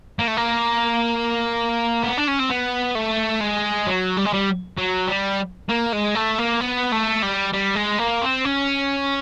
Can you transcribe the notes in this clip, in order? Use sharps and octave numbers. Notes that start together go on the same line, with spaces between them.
A#3
A3
A#3
B3
D4
C#4
C4
B3
A3
G#3
F#3
G3
G#3
G3
F#3
G3
A#3
G#3
A3
A#3
B3
A3
G3
G3
G#3
A#3
C4
C#4